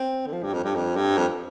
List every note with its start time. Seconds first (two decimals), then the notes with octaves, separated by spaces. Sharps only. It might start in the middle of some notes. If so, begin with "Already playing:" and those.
Already playing: C4
0.27 D3
0.32 F3
0.43 G2
0.54 F2
0.64 G2
0.75 F2
0.96 G2
1.17 F2